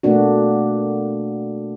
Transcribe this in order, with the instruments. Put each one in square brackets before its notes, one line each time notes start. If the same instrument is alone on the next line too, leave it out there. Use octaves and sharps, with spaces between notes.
[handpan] B2 A3 A#3 D4 F#4